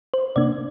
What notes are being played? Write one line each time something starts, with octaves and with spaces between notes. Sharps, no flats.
C5
C3 A#3 D4 D5